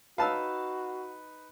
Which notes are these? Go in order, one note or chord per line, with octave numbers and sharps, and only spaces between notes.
D#4 F#4 B4 F5 A5 E6